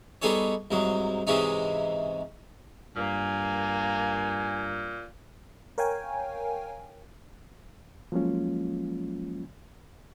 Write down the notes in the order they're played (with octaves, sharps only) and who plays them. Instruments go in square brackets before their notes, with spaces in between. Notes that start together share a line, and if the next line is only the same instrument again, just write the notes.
[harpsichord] G3 B3 D#4 G#4 A4 C#5
C2 G#2 F#3
G#2 C3 E3 G#3 C#4 D#4
[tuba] G2 [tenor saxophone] A#2 [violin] A#3 [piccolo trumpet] G#5
[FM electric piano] A#4 C#5 F5 G5 G#5
[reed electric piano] F3 F#3 G#3 A#3 C#4 F4